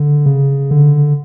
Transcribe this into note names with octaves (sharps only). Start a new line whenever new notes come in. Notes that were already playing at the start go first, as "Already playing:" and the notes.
Already playing: D3
C#3
D3